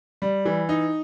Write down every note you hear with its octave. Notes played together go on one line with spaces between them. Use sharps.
G3
E3
D#4